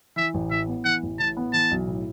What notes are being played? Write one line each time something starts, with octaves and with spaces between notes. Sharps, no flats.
E3 E5
A1
A2 E5
B3
E3 F#5
A1
A2 A5
B3
E3 A5
B1
A2